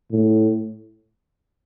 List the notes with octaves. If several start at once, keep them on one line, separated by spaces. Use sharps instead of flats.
A2